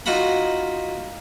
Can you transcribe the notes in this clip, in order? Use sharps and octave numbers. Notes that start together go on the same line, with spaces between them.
D#4 F4 F#4 F#5 A#5 B5